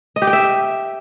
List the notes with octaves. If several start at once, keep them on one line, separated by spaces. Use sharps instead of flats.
D#5
G4
G5
E5